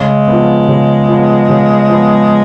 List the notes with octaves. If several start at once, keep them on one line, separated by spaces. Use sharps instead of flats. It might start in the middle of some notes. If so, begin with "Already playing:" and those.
Already playing: C#3 G#3
F3 B3
C#3
F3 B3
C#3
F3 B3